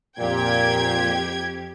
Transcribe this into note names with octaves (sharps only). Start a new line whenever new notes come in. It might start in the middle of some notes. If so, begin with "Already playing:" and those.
F2 A#2 G4 G5 G#6